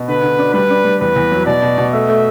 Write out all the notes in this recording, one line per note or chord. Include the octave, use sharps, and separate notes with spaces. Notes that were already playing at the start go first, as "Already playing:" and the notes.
Already playing: B2
D3 B4
D3
D4
G3 B4
D4
G3
E2 B4
E2
F#3
B2 D5
B2
B2
A3 E5
A3